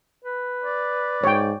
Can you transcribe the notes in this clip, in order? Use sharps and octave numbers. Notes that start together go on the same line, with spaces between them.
B4
D5
G#2 C#5 G5